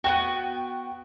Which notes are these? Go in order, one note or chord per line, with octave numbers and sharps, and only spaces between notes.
B3 C4 F#4 G5